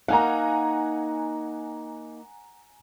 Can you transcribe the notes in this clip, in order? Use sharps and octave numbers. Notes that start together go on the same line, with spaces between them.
A#3 D#4 F5 F#5 G#5 A#5